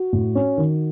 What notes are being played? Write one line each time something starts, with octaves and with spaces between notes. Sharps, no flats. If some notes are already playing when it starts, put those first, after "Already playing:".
Already playing: F#4
A2
C#4
D#3